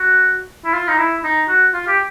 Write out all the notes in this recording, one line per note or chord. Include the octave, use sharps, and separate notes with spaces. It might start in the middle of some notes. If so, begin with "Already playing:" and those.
Already playing: F#4
E4
F4
D#4
E4
D#4
F#4
F4
G4